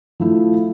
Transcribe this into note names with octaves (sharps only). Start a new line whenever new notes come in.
F3 A3 E4